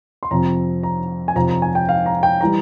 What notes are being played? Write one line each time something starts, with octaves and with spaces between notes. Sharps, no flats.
C6
F2 C3 F3 C4 A#5
A#5
G#5
F2 C3 F3 C4 A#5
A#5
G#5
G5
F5
A#5
G5
E3 G3 A#5